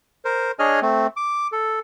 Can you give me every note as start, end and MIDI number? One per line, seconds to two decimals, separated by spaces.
0.25 0.51 70
0.25 0.51 72
0.59 0.80 62
0.59 0.80 68
0.59 0.80 73
0.59 0.80 75
0.59 0.80 80
0.59 0.80 89
0.82 1.07 57
0.82 1.07 60
1.17 1.47 86
1.52 1.79 69